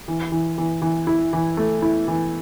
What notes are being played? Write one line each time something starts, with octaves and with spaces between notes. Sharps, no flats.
E3
E3
E3
E3
E4
E3
A3
E4
E3